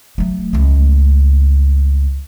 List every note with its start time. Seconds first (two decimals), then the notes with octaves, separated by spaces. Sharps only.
0.18 F#3 A3
0.53 C#2 A3